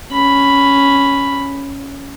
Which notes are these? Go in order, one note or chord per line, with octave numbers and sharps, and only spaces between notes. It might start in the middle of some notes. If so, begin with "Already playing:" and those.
C#4 B5